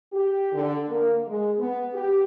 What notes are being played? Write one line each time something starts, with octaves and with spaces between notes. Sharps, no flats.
G4
D3
A#3
G#3
B3
G4